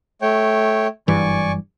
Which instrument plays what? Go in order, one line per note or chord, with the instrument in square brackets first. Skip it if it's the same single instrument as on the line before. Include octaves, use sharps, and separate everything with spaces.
[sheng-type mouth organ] A3 C#5 G5
[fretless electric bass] F#1 G2 E3 [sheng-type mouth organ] D5 G#5 C#6